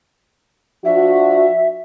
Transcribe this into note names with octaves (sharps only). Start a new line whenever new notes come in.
F3 D4 F#4 E5